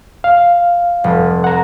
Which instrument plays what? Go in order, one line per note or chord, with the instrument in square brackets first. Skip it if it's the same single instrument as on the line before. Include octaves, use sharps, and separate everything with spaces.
[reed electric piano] F5
[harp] F1
[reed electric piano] F#5 A#5